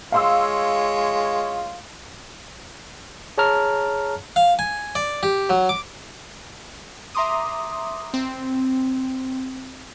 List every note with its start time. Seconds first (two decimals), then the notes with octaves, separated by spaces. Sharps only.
0.12 G#3 F4 C#5 F5 C6 E6
3.38 G#4 C#5 A5 A#5 F6
4.36 F5
4.59 G#5
4.95 D5
5.23 G4
5.50 F#3
5.69 D6
7.15 E5 A#5 C6 D6 D#6
8.14 C4